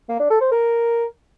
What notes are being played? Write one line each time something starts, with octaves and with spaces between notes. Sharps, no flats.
A#3
D4
A4
C5
A#4